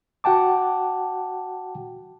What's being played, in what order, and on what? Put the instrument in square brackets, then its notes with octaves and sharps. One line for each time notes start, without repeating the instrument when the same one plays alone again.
[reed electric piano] F#4 F#5 G5 A5 D6